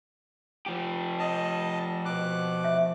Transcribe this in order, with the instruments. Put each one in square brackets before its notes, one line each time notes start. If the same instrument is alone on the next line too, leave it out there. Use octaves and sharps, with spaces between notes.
[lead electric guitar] F3 G4
[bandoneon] D#5 A5
B2 D6 F#6
[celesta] E5